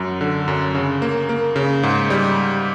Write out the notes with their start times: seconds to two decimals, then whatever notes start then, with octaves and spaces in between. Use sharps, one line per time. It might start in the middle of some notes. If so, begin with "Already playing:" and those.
Already playing: F#2 F#3
0.21 D3
0.48 F#2
0.75 C#3
1.02 A#3
1.29 A#3
1.56 C#3
1.83 G#2
2.10 G3